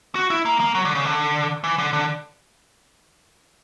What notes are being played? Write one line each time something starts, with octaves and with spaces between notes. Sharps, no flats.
F#4
E4
A#3
A#3
F#3
D3
C#3
D3
E3
D3
D3